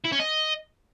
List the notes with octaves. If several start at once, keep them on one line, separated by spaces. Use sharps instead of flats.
E4
C#4
D#5